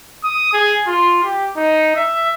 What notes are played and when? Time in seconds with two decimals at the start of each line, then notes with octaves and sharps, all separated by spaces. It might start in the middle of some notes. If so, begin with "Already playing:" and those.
0.24 D#6
0.53 G#4
0.87 F4
1.24 G4
1.57 D#4
1.96 E5